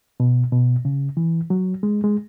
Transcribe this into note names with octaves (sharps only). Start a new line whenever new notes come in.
B2
B2
C#3
E3
F#3
G#3
G#3